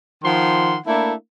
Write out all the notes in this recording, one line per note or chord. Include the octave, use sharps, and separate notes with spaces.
D#3 F3 F#5 C6
A3 A#3 D4 E4